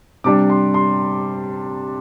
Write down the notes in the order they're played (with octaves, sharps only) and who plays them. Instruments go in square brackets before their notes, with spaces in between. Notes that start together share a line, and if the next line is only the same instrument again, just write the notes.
[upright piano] C3 G3 D4 D6
C6
C6